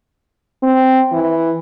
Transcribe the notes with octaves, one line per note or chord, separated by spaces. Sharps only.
C4
E3